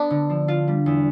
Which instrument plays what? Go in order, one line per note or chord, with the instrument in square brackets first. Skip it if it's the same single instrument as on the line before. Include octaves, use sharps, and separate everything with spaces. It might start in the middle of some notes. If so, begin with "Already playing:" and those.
Already playing: [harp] B3 [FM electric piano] D4
[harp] D3
F3
F4
G3
E2